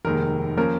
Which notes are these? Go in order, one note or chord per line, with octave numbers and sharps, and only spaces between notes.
F1 D#2 D#3 G#3 A#4
F3 A#3 C#4 A#4